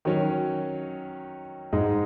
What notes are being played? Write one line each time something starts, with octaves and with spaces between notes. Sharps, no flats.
D#3 F#3 C#4
G#2 G#3 D#4